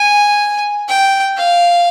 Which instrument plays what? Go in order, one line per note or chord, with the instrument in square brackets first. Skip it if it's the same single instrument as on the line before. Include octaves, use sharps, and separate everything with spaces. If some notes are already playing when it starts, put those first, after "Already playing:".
Already playing: [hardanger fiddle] G#5
G5
F5